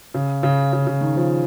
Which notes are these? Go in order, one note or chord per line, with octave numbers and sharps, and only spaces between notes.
C#3
C#3
C#3
C#3
D#3
F3